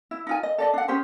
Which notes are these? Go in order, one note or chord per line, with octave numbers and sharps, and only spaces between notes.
E4
D#4 F4 G#5
D#5
A4 D5 D#5
D4 F#5
C#4 G4 G#4 C5